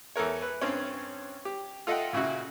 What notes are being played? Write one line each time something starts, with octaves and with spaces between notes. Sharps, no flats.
E2 A4 A#4 C#5
B4
G2 C4 C#4
G4
F4 A4 D#5 E5 F#5 G5
A#2 C#3 E4 F#4